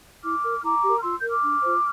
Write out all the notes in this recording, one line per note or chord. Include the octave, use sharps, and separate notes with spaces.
E4 D6 F6
A#4
E4 A#5 D6
G4 A#4
F6
F4 C6 E6
A#4 G6
D6 F6
D4
F4 C5